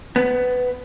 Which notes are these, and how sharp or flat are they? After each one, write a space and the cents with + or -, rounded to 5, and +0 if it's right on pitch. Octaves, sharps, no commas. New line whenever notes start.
B3 +15